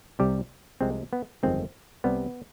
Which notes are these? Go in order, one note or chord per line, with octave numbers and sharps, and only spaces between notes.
C2 C3 G3 G4
C2 C3 F3 G#3 C4
B3
G1 F2 D#3 G#3 C4
C2 C3 G3 B3